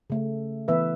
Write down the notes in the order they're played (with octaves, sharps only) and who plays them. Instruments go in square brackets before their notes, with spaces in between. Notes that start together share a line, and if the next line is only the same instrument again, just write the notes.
[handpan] C#3 A3
E3 B3 B4 E5